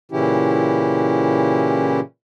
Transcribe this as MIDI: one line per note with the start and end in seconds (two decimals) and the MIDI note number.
0.11 2.00 46
0.11 2.00 49
0.11 2.00 52
0.11 2.00 61
0.11 2.00 64
0.11 2.00 67